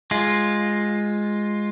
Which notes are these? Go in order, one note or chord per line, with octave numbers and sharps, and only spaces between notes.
G#3 F4